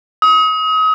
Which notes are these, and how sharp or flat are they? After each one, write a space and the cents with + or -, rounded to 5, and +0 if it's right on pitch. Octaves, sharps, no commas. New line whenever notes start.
D#6 +35